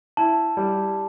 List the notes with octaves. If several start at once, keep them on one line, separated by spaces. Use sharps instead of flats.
E4 A5
G3